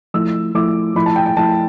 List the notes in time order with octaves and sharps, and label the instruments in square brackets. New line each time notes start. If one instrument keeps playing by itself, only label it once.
[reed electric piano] F3 A3 E4 [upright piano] E6
[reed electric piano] F3 A3 E4 [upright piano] D6
[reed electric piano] F3 A3 E4 [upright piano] B5
[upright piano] A5
G5
G5
[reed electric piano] F3 A3 E4 [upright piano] A5